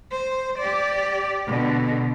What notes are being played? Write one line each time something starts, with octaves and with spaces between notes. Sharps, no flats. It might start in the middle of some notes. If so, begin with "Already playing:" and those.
C5
G4 D5
B2 D3